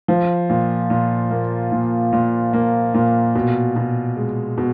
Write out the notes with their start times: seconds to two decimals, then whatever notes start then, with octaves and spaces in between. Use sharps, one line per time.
0.08 F3
0.49 A#2
0.90 A#2
1.31 A#3
1.72 A#2
2.13 A#2
2.53 A#3
2.94 A#2
3.35 B2
3.76 B2
4.17 G#3
4.58 B2